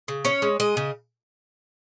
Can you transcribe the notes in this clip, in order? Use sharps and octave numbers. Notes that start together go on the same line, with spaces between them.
C#3
C#4 C#5
G#3
G#3 D#5
C#3